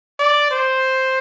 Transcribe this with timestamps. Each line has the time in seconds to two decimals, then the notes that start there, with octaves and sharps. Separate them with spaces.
0.19 D5
0.51 C5